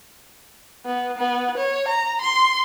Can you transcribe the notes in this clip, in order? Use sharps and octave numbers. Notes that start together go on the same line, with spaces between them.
B3
B3
C#5
A#5
C6